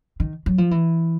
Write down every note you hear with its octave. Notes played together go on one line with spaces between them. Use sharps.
D#3
F#3
F3
E3